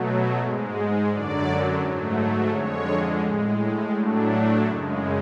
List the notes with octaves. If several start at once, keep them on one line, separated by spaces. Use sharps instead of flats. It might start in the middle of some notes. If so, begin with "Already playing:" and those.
Already playing: B2 F#3 A3
G#2 G#3
F#2 D3 F#3 D5
G#2 F#3 A3
F2 D3 G#3 C#5
A2 G#3
A2 F#3 A3 D4
F#2 C#3 G#3